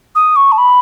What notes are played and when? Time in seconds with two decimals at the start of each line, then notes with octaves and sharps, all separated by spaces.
0.15 D#6
0.36 C#6
0.52 A5
0.58 B5